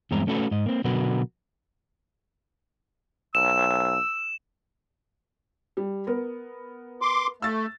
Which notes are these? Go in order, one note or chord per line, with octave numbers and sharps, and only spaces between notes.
E2 G2 G#3 C4 E4 A#5
A3 C#4 F#4 A4 B4
G#2 D#5
A#3 C4
B2 D3 F#3 F#4 A#4 B4
B1 E6 E7
G3
B3 A#4
C6 D6
A3 E6 A6